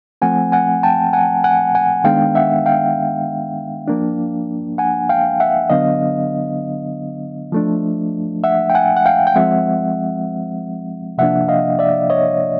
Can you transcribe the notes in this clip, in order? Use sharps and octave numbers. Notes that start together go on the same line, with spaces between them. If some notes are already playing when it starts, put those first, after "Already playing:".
F3 A3 C4 F#5 G#5
F#5 G#5
G5 A5
F#5 G#5
F#5 G#5
F#5 G#5
D#3 G#3 B3 D4 F5 G5
E5 F#5
F5 G5
F3 A#3 D4
F#5 G#5
F5 G5
E5 F#5
D3 F#3 B3 D4 D#5 F5
F3 A3 D4
E5 F#5
G5
F#5 G#5
F#5
F5 G5
G5
F3 G#3 C4 E5 F#5
C3 F3 A#3 D4 E5 F#5
D#5 F5
D5 E5
C#5 D#5